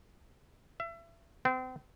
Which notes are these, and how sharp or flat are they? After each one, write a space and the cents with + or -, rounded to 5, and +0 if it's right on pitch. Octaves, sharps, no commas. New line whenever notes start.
E5 +30
C4 -35